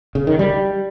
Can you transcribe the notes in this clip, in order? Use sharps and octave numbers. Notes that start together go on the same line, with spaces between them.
C#3
D#3
G3